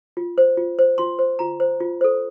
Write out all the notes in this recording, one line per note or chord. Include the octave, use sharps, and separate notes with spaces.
F4
C5
F4
C5
F4 C6
C5
F4 A#5
C5
F4
A4 C5